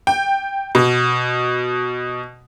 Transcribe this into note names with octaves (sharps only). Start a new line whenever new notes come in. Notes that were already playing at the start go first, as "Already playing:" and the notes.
G5
B2